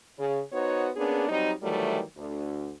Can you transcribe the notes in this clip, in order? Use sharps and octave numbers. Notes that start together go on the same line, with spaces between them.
C#3
B3 D#4 F#4 C5 C#5
A#3 B3 C#4 D4 G#4
F#3 G3 C4 D#4
D#3 E3 F#3 G3 A3
D2